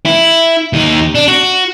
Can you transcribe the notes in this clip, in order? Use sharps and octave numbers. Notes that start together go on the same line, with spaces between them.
E4
D#2 D#4
D4
F#4